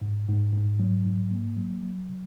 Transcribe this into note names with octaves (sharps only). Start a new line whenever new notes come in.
G#2
G#2
G#2
F#3
G#2
A#3
F#3
F#3
C3